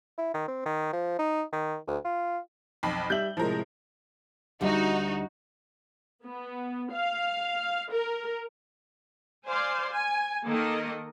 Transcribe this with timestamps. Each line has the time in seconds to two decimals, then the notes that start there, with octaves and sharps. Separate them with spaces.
0.18 E4
0.34 D#3
0.48 C4
0.66 D#3
0.93 F3
1.19 D#4
1.53 D#3
1.87 D2
2.05 F4
2.83 B1 F2 B5
3.10 G3 E5 G6 F#7
3.37 A2 C3 F3 G#3 A#4
4.61 D2 G3 D#4 F#4
6.26 B3
6.93 F5
7.93 A#4
9.48 C5 D5 F5 G#5 C6
9.90 G#5
10.48 D#3 A#3 A4 A#4 D#5